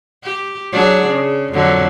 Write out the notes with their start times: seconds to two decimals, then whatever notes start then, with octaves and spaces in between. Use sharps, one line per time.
0.23 G4
0.72 F#3 D4 G#4
1.07 C#3
1.53 F2 D3 F#3